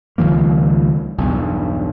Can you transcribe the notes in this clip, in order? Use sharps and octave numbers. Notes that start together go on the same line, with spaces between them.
C#2 D#3 F3 A#3
B1 E2 G2